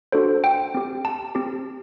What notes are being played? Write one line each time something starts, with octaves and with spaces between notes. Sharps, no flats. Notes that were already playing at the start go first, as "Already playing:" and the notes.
D4 F#4 A4 C5
G5
C4 G4
A5
C4 G4